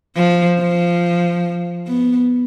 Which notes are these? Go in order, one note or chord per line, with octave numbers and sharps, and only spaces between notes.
F3
F3
B3